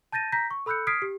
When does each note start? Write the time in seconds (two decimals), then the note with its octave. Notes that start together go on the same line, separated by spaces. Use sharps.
0.12 A5 G6 A6 A#6 D#7
0.32 A#5 G6 A#6 B6
0.51 C#6
0.66 A4 B5 E6 F#6 G6 C#7
0.87 D#6 F6 G#6 B6 C7 D7
1.02 G4